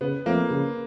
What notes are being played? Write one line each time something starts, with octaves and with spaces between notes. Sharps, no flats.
C#3 B3
F3 A3 A#3 C4
C#3